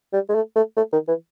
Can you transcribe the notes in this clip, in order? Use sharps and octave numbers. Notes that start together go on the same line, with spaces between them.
G3
G#3
A3
A3
A3
D#3
E3